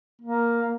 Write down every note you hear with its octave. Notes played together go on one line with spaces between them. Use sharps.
A#3